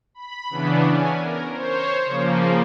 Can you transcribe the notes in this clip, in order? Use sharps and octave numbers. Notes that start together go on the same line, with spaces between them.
B5
C#3 E3 B3 D4
C#4 G#5
A#4
C5 C#5
C#3 F3 A#3